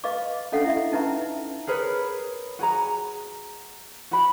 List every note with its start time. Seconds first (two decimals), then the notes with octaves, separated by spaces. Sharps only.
0.04 B4 D#5 F5 D6
0.52 C#4 D4 A4 D#5 F5 F#5
0.65 E4 E5
0.92 C#4 D#4 B4 E5 A#5
1.67 G#4 A#4 B4 C#5
2.59 F#4 G#4 A#5
4.11 F#4 B5